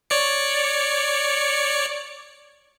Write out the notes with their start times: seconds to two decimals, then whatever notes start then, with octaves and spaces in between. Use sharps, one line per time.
0.10 C#5 D5 C#7